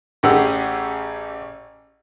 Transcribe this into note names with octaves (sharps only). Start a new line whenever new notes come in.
A1 C#4 G4 G#4 F#5 E6